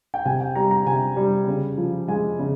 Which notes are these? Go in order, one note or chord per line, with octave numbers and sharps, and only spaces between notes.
G5
C3 G#5
G5
G3 A#5
A#5
C3 G#5
G3
C#3
F3
G#3 G#5
C#3